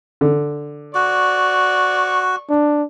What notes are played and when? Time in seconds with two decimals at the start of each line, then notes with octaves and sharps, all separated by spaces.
0.21 D3
0.95 F#4 D5 C#6
2.50 D4